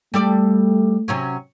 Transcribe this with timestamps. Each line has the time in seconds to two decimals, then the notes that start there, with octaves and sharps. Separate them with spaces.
0.14 G3 A3 A4 D5
1.08 C3 F#3 C#4